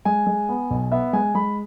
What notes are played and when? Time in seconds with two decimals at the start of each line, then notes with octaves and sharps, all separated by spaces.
0.05 G#3 G#5
0.27 G#3
0.49 B3
0.71 B1
0.91 B3 E5
1.13 G#3 G#5
1.35 G#3 B5